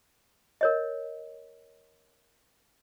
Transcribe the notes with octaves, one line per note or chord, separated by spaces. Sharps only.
A#4 C#5 D#5